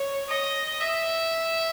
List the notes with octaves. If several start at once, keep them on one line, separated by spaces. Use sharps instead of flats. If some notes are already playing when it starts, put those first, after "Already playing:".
Already playing: C#5
D#5
E5